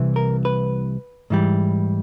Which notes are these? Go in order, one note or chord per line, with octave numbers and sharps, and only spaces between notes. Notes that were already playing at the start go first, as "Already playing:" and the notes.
Already playing: C2 C3 E3
A#4
B4
G#2 E3 G3